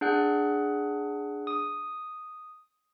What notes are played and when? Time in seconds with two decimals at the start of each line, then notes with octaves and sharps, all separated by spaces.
0.01 D4 G#4 F#5 F#6
1.47 D#6